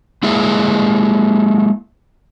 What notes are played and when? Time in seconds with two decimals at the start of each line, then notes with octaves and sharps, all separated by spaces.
0.23 G#3 A#3 E4 G#4 E5